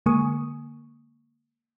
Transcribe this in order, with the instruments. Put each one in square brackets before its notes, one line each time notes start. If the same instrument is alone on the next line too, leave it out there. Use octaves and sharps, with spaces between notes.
[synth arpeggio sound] D3 G#3 A#3 G#5 C#6 D#6